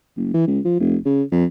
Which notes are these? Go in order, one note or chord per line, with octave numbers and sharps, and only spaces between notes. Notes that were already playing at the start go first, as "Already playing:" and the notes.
F#1
E3
C#2
F3
F1
C#3
F2